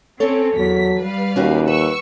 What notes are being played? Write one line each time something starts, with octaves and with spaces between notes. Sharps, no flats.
C4 C#4 A4 C#5
E2 F#3 B6
G3 B4 F5
D#2 C#4 F#4 G4
B4 C#6 E6